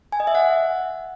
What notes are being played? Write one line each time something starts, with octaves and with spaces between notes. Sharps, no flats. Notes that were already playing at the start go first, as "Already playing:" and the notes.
G#5
D#5
E5
F#5